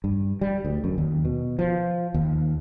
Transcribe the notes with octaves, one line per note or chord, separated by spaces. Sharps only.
G2
G3
D2
F#2
D#2
B2
F3
D#2